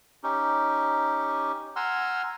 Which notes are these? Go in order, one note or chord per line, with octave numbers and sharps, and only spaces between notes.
C#4 D#4 G4
F#5 G#5 A#5 C6 E6 F6